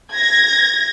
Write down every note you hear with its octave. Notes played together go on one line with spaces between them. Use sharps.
G#6 A#6